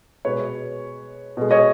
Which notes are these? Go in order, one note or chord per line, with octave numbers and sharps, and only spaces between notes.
B2 G#3 B4 C#5
B2 G#3
C#5 D#5